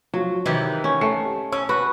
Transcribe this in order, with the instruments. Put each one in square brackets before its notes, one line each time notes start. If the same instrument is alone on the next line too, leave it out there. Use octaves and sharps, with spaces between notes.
[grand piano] F3 [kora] F#3
[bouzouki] C3 E3 D#4 [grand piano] D#3 B4 [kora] E4 G4
[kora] C#4
[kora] A3 [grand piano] C7 C#7
[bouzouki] C#4 [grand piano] C#6 E6
[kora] F#4 [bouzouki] B4